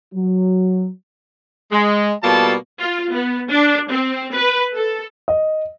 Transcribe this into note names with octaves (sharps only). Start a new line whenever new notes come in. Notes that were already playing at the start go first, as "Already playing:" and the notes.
F#3
G#3
B2 G3 A#3 F4 A4 A5
F4
B3
D4
C4
B4
A4
D#5